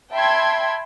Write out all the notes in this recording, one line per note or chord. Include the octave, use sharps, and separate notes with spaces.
E5 G5 A5 B5 C6 G#6